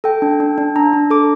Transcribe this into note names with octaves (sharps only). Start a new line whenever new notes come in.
A4 G5
D4
D4
D4
D4 A#5
D4
A4 D6